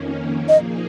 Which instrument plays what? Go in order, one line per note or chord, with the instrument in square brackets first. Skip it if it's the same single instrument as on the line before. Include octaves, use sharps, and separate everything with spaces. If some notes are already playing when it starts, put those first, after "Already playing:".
Already playing: [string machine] F2 D#3 A#3 C#4
[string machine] A#2 F3 A#3 D#4 G#4 [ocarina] D#5